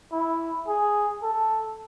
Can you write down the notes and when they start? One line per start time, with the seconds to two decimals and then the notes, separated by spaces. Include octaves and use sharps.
0.12 E4
0.68 G#4
1.23 A4